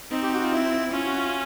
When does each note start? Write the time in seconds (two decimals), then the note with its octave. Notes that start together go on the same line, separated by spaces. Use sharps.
0.11 C4 D#4
0.23 G4
0.33 F#4
0.42 F4
0.52 E4
0.92 C#4 F4
1.05 F#4
1.17 F4